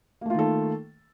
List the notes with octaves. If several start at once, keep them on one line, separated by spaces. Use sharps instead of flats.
D#3 A3 A#3 F4 A4